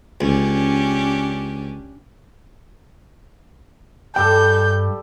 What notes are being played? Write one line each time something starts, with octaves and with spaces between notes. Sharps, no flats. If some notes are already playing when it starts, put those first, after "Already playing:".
C#2 C#4 D4 G4
G2 G3 G4 A4 G5 G6